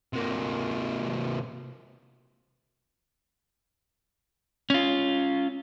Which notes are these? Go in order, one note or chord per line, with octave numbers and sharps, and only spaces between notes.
C3 A#3
C#4 F4